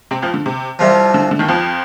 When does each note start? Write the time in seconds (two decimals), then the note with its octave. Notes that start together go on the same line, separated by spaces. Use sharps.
0.11 C3 C4
0.22 F2 F3
0.34 D3
0.46 C3
0.79 C2 C3 F3
1.14 D3
1.31 D3
1.39 D#2 D#3
1.48 F2 F3